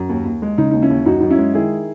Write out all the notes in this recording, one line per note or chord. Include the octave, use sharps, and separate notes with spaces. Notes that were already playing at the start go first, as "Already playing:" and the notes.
Already playing: F#2
D#2
D#2
G#3
C#3 D#4
D#2 D#4
C#4 E4
D#2
F#2 D#4 F#4
F#2 D#4
C#4 E4
G#3
D#3 E4 G#4